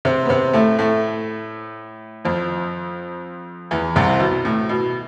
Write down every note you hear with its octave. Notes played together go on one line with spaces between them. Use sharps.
C3 C4
B3
C3 C4
A2 A3
A2 A3
F2 F3
E2 E3
C2 C3
B2
A2
B2